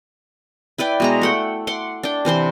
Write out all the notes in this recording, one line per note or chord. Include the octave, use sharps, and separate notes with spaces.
E4 B4 D5 G5
B2 G#3 A#5
A3 F#5 G5
F#5 C6 D6
D4 G5
C3 E3 C5 C6